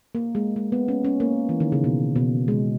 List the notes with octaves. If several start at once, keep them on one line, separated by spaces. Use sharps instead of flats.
A#3
G#3
G#3
B3
C#4
C#4
A#3
E3
D#3
C#3
B2
B2
G#3